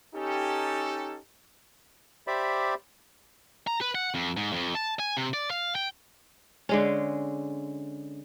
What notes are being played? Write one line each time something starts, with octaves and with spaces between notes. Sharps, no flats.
C#4 D#4 G4 A4
G4 C5 D5 E5 B5
A#5
B4
F#5
F2
G#2
F2
A5
G#5
C3
D5
F5
G5
D3 G#3 C#4